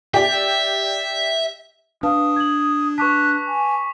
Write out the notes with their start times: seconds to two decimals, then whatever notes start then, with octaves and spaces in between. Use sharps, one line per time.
0.14 G4 D5 E5
2.03 D4 B4 F5 A5 D#6
2.36 G#6 F#7
2.98 B4 A5 C#6 D6 F#6 B6
3.48 G#5